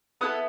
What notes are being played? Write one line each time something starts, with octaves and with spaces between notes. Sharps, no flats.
B3 E4 A4 D#6 F#6